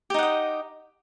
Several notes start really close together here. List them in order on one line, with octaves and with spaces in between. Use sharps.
G4 D#4 F#5 D#5